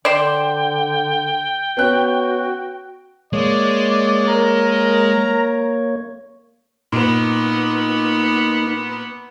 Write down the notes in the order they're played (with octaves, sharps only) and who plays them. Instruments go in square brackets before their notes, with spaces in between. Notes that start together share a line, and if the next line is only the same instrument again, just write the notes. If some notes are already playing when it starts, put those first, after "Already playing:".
[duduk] D3 [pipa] C5 D5 [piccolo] G5
[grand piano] B3 C#4 F#6 [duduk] F#4
[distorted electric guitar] G#3 [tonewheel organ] A#3 C#5 [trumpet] D5
[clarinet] A#4 [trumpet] A#5
[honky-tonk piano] A#2 [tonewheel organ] A#3 D#4 [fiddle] B3